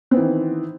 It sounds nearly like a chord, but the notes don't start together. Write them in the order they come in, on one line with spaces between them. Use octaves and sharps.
C4 B3 E3 D#3